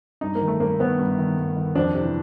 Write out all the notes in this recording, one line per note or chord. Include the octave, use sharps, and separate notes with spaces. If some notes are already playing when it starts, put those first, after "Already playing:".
G2 D#4
A#3
D#3
A3
G2 A#3
D#3 B3
G2
D#3
G2
D#3
F2 D4
C3
E3